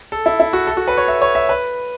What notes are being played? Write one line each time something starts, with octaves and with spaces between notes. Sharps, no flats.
A4
E4
E4
F#4
A4
F#4
B4
C#5
E5
C#5
E5
B4